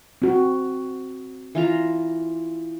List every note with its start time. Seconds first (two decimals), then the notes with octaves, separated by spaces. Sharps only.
0.22 C4 F#4
1.55 E3 F4 A#5